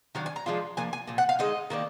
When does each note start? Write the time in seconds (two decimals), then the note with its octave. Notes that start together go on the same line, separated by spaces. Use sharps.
0.15 D#3 F#3 D4 F5
0.26 G#5
0.36 A#5
0.46 F3 G#3 D4 F4
0.77 F3 A#3 D4 G#5
0.93 G#5
1.08 A#2 F3
1.18 F#5
1.29 F5
1.39 D3 G#3 D#4 D#5
1.70 D#3 A#3 D4